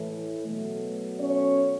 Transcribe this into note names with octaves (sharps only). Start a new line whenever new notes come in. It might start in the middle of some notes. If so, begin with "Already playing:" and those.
Already playing: A2 E3 A3
B2 F#3 A3
C#4 C#5